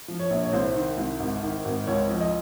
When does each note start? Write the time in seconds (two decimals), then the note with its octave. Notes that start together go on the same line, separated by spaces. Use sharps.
0.08 F3
0.19 C#5
0.30 A#1
0.44 C#5
0.53 C2 C5
0.75 D#3
0.97 C2
1.20 G#1
1.43 D#3
1.65 G#1
1.87 C#2 C#5
2.09 F3
2.21 D#5